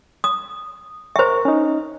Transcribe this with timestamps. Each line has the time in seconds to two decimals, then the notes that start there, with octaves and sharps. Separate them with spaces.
0.24 D#6
1.16 A#4 C5 E5 C#6
1.45 C#4 D#4